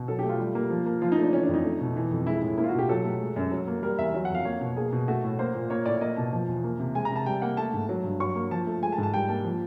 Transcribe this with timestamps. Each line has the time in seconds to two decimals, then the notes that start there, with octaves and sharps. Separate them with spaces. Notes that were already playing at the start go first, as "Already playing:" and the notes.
Already playing: B2
0.08 F#3 A4
0.19 G4
0.24 A3
0.29 F4
0.39 G3
0.55 A#3
0.70 F3
0.86 A#3
1.02 F3 F4
1.12 D#4
1.18 A3
1.23 D4
1.33 E3 C#4
1.43 D4
1.49 F2 D#4
1.64 A3
1.80 B2
1.96 E3
2.11 F2
2.27 G#3 E4
2.42 A2 E4
2.57 A#3 E4
2.63 F4
2.69 F#4
2.74 B2 G4
2.89 F#3 A4
3.05 A3
3.21 G#3
3.36 F#2
3.52 F#3
3.67 A#3
3.82 G3 A#4
3.98 E2 E5
4.14 F#3
4.25 F#5
4.30 F2 F5
4.45 A#3 C#5
4.61 B2
4.77 A#3 G#4
4.92 B2
5.08 A3 F#4
5.24 A2
5.39 A#3 C5
5.54 A#2
5.70 A#3 C#5
5.86 A2 D5
6.01 A#3 D#5
6.17 B2 A5
6.33 F3
6.48 E2
6.64 A#3
6.79 C3
6.95 G#3 G#5
7.05 A#5
7.11 C3 A5
7.26 G3 G5
7.42 A#3 F#5
7.57 A3 A5
7.73 G#2
7.89 F#3
8.04 G2
8.20 F#3 C#6
8.36 A#3
8.51 F3 A5
8.67 A3
8.82 G#3 G#5
8.92 A5
8.98 G#2
9.03 A5
9.13 G3 G5
9.29 A#3 A5
9.44 F3